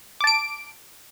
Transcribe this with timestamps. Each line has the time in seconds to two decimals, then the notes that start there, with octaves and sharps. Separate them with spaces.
0.21 D6
0.24 A5
0.27 D7